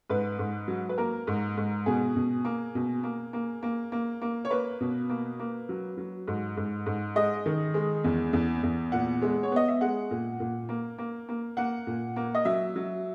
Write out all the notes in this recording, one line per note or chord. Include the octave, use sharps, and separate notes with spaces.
G#2 B4
G#2
F#3
B4
A#3 A#4
G#2
G#2
B2 G#4
B2
A#3
B2
A#3
A#3
A#3
A#3
A#3
C#5
A#3 B4
B2
A#3
A#3
F#3
F#3
G#2
G#2
G#2
G#3 D#5
D#3
G#3
E2
E2
E2
A#2 F#5
G#3
C#5
B3 D#5
E5
G#3 F#5
A#2
A#2
A#3
A#3
A#3
A#3 F#5
A#2
A#3
D#5
F#3 E5
F#3